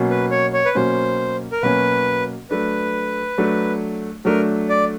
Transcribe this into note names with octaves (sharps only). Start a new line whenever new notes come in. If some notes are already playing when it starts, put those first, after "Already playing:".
Already playing: B2 F#3 A#3 C#4
B4
C#5
C#5
B4
B2 F#3 A#3 C#4 C5
A#4
B2 F#3 A#3 C#4 B4
F#3 A3 D4 B4
F#3 A3 D4
F#3 A3 D4 A#4
D5